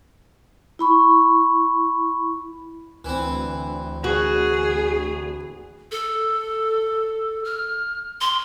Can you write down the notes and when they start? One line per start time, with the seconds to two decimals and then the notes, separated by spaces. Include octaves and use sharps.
0.79 E4 B5 C#6
3.05 D2 E3 C4
4.04 F#4 G#4
5.92 A4
7.45 F6
8.21 C6